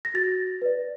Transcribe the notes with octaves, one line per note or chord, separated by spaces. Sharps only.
A#6
F#4 A6
B4 D5